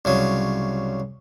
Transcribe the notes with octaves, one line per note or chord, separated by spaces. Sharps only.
C2 C#3 F#3